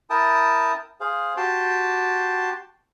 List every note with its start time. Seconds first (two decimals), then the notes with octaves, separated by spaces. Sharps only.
0.10 E4 A#4 G5 A5 D#6
1.01 G#4 C5 F5
1.37 F#4 G4 G5 A5 C6